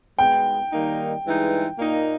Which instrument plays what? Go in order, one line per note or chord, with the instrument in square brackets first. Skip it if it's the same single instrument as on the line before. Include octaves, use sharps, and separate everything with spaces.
[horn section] B2 G#3 B3 [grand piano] G5
[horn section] D#3 G3 A#3 D#4
G2 E3 G#3 D#4
A#2 A#3 D#4